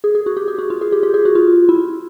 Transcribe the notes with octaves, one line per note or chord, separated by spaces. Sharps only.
G#4
G#4
F#4
G4
G#4
F#4
F4
G#4
G4
G4
G#4
F#4
F4
E4